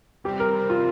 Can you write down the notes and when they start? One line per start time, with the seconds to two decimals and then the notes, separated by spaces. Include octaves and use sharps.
0.24 C3 G3 C4 G4
0.40 A#4
0.54 C3 G3 C4
0.70 F4